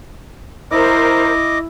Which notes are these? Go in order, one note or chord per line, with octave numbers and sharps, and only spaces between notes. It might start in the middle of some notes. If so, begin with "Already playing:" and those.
E4 A#4 C5 D#5 D6